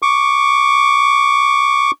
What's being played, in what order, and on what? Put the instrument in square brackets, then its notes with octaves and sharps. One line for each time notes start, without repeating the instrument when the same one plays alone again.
[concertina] C#6 D6